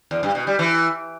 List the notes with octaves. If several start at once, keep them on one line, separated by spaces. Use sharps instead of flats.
E2
G2
B2
G3
E3